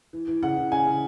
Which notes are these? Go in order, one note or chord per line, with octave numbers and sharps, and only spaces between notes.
E3
E3
C#3 F#5
E3
C#3 G#5
C#3